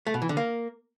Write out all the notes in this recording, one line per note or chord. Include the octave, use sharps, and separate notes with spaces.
A3
B2
E3
D3
A#3